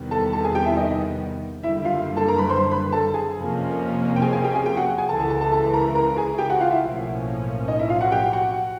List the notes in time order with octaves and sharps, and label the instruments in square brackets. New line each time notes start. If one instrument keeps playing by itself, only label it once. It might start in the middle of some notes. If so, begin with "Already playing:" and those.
Already playing: [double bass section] E2 C3 D#3 G3 B3
[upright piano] A4 A5
A4 A5
G#4 G#5
G4 G5
E4 E5
D#4 D#5
[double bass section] F#1 F#2 D3 G3 [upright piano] E4 E5
[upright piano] F4 F5
A4 A5
A#4 A#5
B4 B5
C5 C6
B4 B5
A4 A5
G#4 G#5
[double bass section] F2 C3 F3 A#3 C#4
[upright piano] G5
G#4 G#5
G#4 G#5
G4 G5
G#4 G#5
G4 G5
F#4 F#5
G#4 G#5
[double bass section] C#2 C#3 E3 [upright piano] A4 A5
[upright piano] A4 A5
A4 A5
A4 A5
A4 A5
A#4 A#5
A#4 A#5
G#4 G#5
G4 G5
F#4 F#5
F4 F5
E4 E5
[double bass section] B1 A2 F3 A#3 C#4
[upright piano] D#4 D#5
E4 E5
F4 F5
F#4 F#5
G4 G5
F#4 F#5